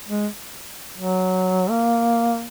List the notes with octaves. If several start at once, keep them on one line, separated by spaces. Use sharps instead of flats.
G#3
F#3
A#3